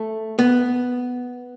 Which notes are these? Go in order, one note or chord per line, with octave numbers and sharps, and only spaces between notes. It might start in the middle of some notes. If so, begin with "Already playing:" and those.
Already playing: A3
B3